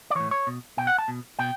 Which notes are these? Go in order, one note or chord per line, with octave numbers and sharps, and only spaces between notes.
D5
A2 E3 C#5
C#5
B2
B2 G5
F#5
A5
B2
B2 G5